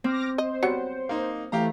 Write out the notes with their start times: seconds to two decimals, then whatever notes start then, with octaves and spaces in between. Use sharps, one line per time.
0.04 C4 D6 F6 A#6
0.38 C5 D#5
0.63 F#3 G3 B3 C#7
1.09 A#3 D#4
1.52 E3 A3 G4 F5 A#5